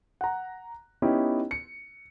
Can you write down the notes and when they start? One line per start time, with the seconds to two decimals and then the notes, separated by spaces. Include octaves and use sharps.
0.21 F#5 A#5
1.02 B3 C#4 D#4 E4 G4
1.51 C#7